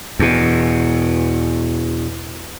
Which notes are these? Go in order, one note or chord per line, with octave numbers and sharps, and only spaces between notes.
E2 B2